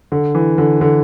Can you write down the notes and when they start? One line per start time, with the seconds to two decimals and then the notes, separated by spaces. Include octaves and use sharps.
0.12 D3
0.35 E3
0.58 D3
0.81 D3